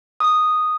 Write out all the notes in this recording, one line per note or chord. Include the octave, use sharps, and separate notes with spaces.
D#6